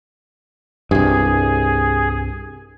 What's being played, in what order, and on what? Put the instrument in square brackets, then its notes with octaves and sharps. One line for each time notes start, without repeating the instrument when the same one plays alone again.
[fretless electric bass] C2 G2 [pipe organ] G#4